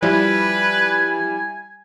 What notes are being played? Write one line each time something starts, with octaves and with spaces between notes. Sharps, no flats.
F3 G3 E4 B4 G#5